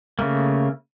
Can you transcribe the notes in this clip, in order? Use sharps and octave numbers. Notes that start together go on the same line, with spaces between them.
C#3 A3 A#3